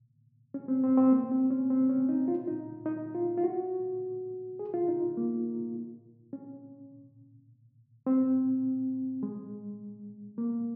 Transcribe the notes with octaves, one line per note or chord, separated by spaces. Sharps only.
C#4
C4
C4
C4
A#3
C4
C#4
C4
C#4
D#4
F4
D#4
D#4
F4
F4
F#4
G#4
F4
D#4
A#3
C#4
C4
G#3
A#3